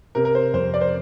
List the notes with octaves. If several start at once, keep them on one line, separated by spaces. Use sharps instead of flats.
C3 A#4
A#4
C5
F2 C5
D5
C5